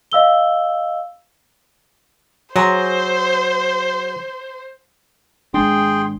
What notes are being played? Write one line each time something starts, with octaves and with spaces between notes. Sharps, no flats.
D#5 F5 E6 G7
F#3 G#4 C5 A#5 C6
G#1 G#3 D4 G#4 G5 C6